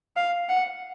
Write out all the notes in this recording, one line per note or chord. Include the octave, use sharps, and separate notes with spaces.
F5
F#5